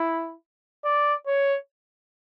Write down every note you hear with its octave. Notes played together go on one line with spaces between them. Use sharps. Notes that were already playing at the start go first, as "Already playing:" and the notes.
Already playing: E4
D5
C#5